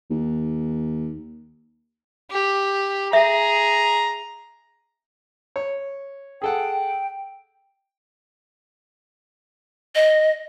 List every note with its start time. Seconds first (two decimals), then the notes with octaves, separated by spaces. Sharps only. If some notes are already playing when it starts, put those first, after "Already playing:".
0.10 D#2
2.31 G4
3.13 G#4 E5 A#5
5.56 C#5
6.42 G#4 A4 F#5 G5
9.95 D#5